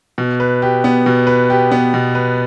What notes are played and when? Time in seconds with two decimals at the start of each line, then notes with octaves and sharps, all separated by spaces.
0.18 B2
0.40 B4
0.62 G4
0.84 B3
1.06 B2
1.27 B4
1.50 G4
1.72 B3
1.94 B2
2.15 B4